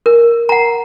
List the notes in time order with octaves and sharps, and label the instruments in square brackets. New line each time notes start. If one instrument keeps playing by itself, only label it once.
[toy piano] A#4
F#5 A#5